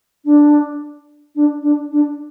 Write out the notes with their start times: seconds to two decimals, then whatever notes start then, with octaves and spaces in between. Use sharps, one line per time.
0.25 D4
1.35 D4
1.63 D4
1.91 D4